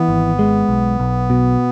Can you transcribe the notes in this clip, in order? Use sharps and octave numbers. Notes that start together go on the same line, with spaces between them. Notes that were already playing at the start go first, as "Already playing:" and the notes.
Already playing: E3 B3
G#1
G#3
B1
B1
B2